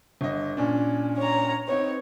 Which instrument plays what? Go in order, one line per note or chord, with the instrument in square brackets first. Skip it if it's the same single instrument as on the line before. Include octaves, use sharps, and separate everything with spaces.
[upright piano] G1 D#5
A#2 C#4 D4
[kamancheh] C#5 A#5
[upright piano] B3 C4 D#4 [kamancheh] C#5